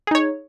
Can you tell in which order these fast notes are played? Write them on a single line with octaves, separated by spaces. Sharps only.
G#4 D#4 C#5